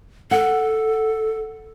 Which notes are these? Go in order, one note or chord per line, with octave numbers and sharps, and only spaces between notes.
A4 F#5